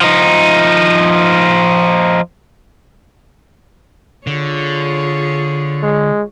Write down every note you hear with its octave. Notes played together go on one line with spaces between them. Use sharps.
F3 D#4
D3 F4 G#4 C#5
G#3